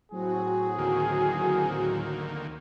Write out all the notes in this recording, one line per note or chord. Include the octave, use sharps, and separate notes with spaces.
A2 F#3 C4 F#4 G#4
D2 D#3 A#3